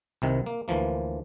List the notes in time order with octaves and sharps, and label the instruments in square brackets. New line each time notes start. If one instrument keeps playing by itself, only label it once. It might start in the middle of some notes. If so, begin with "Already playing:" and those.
[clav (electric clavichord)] C2 C3 D#3
A#3
D2 E3 F3 A#3